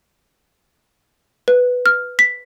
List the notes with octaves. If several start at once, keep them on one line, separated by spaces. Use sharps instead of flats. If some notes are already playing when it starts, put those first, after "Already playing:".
B4
F6
B6